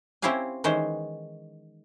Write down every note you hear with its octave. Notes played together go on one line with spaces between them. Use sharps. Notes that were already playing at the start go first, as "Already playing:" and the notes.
C4 C#4 E4 G4 F5 G#5
D#3 E3 G#3 C#4 C5